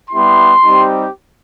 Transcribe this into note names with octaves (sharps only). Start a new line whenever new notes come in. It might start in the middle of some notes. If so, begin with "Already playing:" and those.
G3 B3 E4 G4 C6
G3 C4 D#4 G4